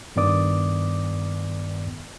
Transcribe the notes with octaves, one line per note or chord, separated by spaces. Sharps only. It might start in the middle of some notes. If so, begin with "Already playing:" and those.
G2 D#3 B3 D5 D6 D#6